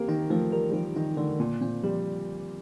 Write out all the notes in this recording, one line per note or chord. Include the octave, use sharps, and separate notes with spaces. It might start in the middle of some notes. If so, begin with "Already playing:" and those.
Already playing: A#3 C4 G4 A#4
D#3 D#4
F3 A3
G3 A#4
G3
F3 G4
D#3 D#4
D3 A3
A#2 D3
A#2 C4
F3 G3